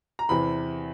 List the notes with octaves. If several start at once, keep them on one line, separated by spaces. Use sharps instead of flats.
A#5
E2 C3 E3 B5